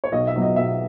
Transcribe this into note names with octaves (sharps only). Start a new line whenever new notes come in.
C#5
B1 D#5
E5
B2 F#3
D#5
B1 E5